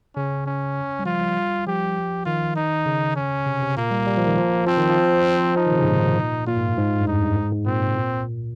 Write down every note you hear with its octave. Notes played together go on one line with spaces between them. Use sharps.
C#3 C#4
C#4
G3
F3 F4
G3
F3 G4
D#3 F4
D#4
C#3
C#4
C3
C3
A#2 A#3
G3
G3
F3
D#3
F3
F3 C4
D#3
F3
F3 D#4
C3 D#3
C#3
G#2
A#2
A#2 F4
G#2
G2
G#2
G2
F2 D#4
G2
G#2
G#2
A#2 C4
C3
A#2